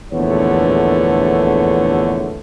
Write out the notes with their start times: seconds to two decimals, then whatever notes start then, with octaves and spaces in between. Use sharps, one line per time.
0.13 A#1 E2 D3 A3 B3 C#5